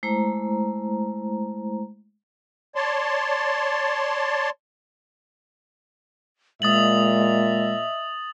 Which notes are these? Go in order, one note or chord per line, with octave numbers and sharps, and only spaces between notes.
G#3 A3 E4 C5 A#5
C#5 D5 A5 C6
A#2 G#3 D#5 E5 D#6 A6 F#7